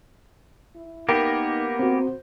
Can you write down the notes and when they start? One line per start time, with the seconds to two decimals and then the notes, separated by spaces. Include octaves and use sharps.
0.75 E4
1.09 A#3 B3 D#4 G4 A#4
1.79 C4 F#4 C5